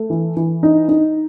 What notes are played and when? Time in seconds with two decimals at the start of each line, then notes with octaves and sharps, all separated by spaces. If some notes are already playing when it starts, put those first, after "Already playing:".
Already playing: A3
0.10 E3
0.37 E3
0.63 D#4
0.88 D#4